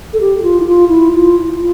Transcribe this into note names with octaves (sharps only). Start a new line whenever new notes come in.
A4
G4
G4
F4
E4
F4
E4
F4
F4